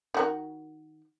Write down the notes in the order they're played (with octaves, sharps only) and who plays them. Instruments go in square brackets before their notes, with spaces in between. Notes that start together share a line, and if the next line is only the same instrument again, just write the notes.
[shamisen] D#3 F#4 A#4